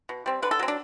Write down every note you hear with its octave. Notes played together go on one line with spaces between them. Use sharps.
B2
G3 C4
D3 B4
A4
F#3 C4
D4